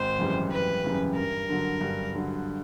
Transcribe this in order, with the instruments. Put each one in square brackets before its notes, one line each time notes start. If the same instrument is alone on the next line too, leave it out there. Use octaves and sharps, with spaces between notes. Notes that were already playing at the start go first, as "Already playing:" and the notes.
Already playing: [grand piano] G#1 [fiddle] C5
[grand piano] F#2 C#3 E3 G3
[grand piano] G#1 [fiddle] B4
[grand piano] F#2 C#3 E3 G3
[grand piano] G2 [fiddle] A#4
[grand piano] D3 F#3
G2
D3 F#3